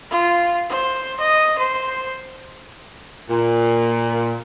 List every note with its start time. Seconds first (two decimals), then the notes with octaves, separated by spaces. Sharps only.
0.10 F4
0.69 C5
1.20 D#5
1.58 C5
3.30 A#2